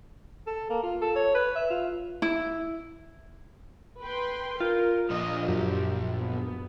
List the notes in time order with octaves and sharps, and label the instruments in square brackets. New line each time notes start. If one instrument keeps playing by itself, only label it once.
[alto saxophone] A4
A#3
F4
A4
C#5
B4
E5
F4
[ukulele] E4
[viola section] B4 G5 C6
[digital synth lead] F4 [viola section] A#4
[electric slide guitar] A#2 F3 D4 [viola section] D#5
[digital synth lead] F#2 [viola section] G4
[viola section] B3